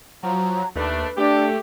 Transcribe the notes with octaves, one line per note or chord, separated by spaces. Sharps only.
F3 F#3 A#5
D#2 A3 D4 B4
A3 D4 G4